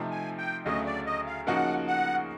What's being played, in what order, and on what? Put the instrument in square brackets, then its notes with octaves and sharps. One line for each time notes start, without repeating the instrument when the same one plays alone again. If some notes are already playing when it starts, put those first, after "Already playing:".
Already playing: [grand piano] C3 F3 A3 C4 D#4
[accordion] G#5
G5
[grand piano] D2 C#3 F#3 A3 [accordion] D#5
[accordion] D5
D#5
F5
[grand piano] C#3 F3 A#3 D#4 F#4 [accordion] F#5
[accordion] F#5